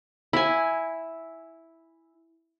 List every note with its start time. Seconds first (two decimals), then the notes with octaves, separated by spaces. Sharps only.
0.33 E4 G#5